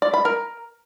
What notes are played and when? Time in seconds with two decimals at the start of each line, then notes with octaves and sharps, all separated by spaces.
0.02 D5
0.14 B5
0.25 A#4